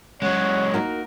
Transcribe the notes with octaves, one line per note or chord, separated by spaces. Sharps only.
F#3 G#3 C#4 C#5 F#5
A#3 D#4 F#4 A#4